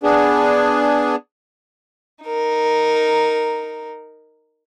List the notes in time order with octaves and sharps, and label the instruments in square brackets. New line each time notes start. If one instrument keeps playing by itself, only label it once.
[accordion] B3 D4 G#4
[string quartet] D#4 A#4